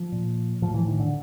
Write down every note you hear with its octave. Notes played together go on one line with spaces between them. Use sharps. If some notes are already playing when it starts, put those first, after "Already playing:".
Already playing: F3
A#2
A2 F3
E3
D#3
D3